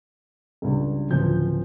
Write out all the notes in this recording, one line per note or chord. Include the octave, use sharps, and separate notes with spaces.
C#2 G2
D1 C#3 F3 G6